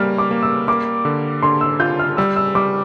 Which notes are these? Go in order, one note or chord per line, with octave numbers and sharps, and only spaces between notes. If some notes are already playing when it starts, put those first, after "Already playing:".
Already playing: G3 A#3 F6
D6
A#3
E6
A#3 D6
D3
D3 C6
E6
F4 G6
F6
G3 E6
E6
G3 D6